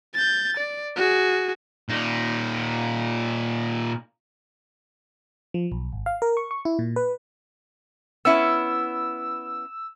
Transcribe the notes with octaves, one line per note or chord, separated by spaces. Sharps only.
G6 A6
D5
F#4 G#4
A#2 D#4
F3
B1
G#1
F5
A#4
C#6
C#6
E4
A#2
B4
B3 C#4 E4 E6